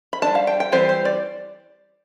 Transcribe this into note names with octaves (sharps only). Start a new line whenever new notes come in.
B5
G3 D4 A5
F5
G5
G5
E3 G3 C4 C5
C5
D5